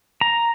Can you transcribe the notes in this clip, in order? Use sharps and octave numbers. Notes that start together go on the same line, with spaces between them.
A#5